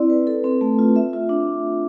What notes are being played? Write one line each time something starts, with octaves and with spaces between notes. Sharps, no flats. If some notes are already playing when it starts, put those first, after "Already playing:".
Already playing: C4 E4 D5
B4
A4
C4
A3
F4
E5
F4
D4